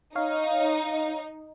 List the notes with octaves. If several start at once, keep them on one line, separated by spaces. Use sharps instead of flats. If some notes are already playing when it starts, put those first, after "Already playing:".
D#4 C#5 F5